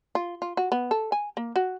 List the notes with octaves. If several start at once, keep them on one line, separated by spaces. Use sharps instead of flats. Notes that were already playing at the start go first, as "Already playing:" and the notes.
F4
F4
F#4
B3
A4
G#5
A#3
F#4